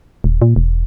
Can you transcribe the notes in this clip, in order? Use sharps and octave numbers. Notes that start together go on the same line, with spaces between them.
D#1
A#2
E1